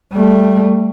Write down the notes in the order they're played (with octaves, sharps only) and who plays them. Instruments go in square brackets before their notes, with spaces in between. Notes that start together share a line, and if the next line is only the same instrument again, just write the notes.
[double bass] G3 A3